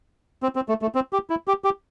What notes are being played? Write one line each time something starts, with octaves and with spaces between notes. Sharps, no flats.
C4
C4
A3
A3
C4
G4
E4
G4
G4